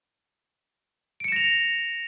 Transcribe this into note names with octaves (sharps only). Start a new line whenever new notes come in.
A#6 C#7 D7 E7 F7